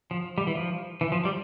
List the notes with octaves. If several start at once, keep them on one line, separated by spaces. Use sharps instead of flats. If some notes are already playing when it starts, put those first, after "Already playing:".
F3
G3
E3
F3
E3
F3
G3